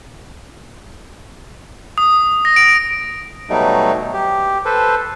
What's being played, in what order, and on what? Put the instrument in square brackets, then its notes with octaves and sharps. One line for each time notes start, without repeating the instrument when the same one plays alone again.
[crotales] D#6
A#6
D7
[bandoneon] B2 F#3 G3 A3 D#4
G4
A4 B4 C5